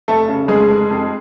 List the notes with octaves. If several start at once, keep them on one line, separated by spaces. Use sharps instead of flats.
F1 A3 A4
C#3
F1 G#3 G#4
F1
F2